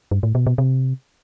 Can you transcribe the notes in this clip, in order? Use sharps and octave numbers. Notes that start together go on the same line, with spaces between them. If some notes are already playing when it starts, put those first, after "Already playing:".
G2
A2
B2
B2
C3